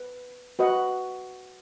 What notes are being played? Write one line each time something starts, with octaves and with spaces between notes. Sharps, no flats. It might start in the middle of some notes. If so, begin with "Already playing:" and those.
Already playing: B4
F#4 B4 D#5 F#5